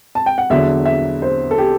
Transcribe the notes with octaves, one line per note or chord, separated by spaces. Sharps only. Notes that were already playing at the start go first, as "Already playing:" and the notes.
A5
G5
F#5
E2 D3 F#3 E5
E5
C5
A4
G4